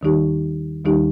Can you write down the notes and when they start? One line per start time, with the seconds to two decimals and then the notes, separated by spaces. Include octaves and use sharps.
0.01 D#2 D#3 G3 D#4 G4
0.85 D#2 D#3 G3 D#4 G4